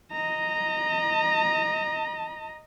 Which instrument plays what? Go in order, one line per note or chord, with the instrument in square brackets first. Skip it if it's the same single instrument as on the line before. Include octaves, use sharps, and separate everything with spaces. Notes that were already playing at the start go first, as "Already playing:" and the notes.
[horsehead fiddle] D#5 A#5